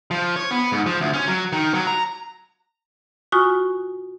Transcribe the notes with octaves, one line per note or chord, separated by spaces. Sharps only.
F3
C#5
B3
G#2
F3
D2
C#4
F#3
D#3
F#3
A#5
F4 F#4 G#5 C#6 D#6